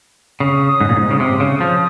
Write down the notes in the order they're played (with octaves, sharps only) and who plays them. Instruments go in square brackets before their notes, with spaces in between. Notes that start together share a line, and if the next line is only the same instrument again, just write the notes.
[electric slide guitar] C#3 [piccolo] D#6
[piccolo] D#6
[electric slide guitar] G#2
A#2
G#2
C#3
[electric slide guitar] C3 [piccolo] D#6
[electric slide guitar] C#3
F3